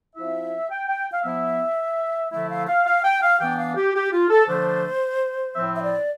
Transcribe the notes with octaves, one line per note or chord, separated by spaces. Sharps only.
F3 C4 E4 E5
G5
G5
F5
F3 B3 E4 E5
D3 F3 A3 E4 E5
F5
F5
F5
G5
F5
E3 B3 D4 G5
F5
G4
G4
F4
A4
D3 F3 A3 D4 C5
A2 F3 C4 E5
E5
D5